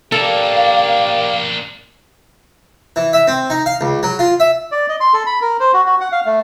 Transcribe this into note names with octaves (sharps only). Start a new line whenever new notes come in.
A#3 D4 G4 A4 A#4 D5 F5
E3
E5
C4
D#4
F5
C#2
F#3
F4
E5
D5
D#5
C6
A4
B5
A#4
C5
F#4
F#4
F#5
F5
A3